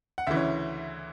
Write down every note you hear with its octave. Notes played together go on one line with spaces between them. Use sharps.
F#5
D2 C#3 E3 E5
C#5